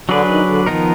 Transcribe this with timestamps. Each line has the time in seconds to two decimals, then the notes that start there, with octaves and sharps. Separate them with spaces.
0.08 D3 F#3 D4 G#4 B4 D5
0.28 D#3
0.47 D3
0.66 D#3 F3 B3 D#4 A#4